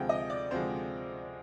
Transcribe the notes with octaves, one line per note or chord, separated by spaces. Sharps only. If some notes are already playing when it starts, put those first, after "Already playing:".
Already playing: D2 C3 F3 G#3 G5
D#5
D5
D2 C3 F3 G#3 C5